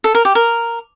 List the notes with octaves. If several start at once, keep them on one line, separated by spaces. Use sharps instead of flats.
A4
A#4
G4
A#4